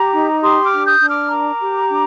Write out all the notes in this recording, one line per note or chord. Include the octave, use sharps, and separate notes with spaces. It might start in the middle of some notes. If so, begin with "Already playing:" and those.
Already playing: G4 A#5 D6
D#4
G4 C6 D#6
D6 F6
D4
D#6 G6
D4
D6 F6
A#4 A#5 D6
G4
D4